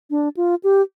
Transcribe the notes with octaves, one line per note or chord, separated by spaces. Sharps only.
D4
F4
G4